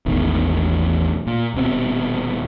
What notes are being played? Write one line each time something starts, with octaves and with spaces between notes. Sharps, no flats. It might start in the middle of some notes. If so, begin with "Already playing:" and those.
E1 A1 E2 D#3
A#2
D#1 B2 C4